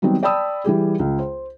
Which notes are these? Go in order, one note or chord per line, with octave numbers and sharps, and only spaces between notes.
D#3 F#3 G3 B3 C4
D5 G5 A5 B5 D#6 E6
E3 G3 G4 G#4
C#2
C5